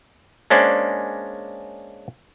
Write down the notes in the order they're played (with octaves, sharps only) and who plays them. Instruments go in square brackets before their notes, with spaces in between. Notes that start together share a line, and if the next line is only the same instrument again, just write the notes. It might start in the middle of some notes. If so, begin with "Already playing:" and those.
[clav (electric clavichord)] G#3 A#3 C#4 D4 C5 D5